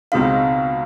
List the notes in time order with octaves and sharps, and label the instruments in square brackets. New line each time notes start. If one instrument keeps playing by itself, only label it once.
[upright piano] C#2 B2 G#3 C4 D#4 [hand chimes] F5